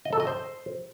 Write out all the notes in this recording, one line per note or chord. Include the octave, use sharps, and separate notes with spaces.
D#5
A4
D#5
C5